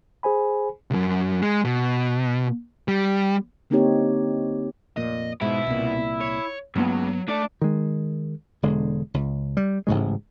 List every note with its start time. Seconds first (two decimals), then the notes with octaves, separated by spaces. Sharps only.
0.23 G#4 C5 G#5 B5
0.91 C2 F#2
1.42 G#3
1.65 B2
2.88 G3
3.70 D3 A#3 C4 D#4 G4 C#5
4.97 F1 A#2 D#5
5.42 G#2 B2 E4
5.67 C2 A#2
6.21 C#5
6.76 C#2 G2 F#3 A#3 B3
7.28 A3 D4 D5
7.62 D#3 G#3
8.62 E1 D3 G#3
9.14 C#2
9.57 G3
9.87 A1 G#2 C#3 G#3